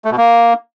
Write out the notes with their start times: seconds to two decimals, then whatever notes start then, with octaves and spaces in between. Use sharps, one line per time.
0.05 A3
0.11 B2
0.18 A#3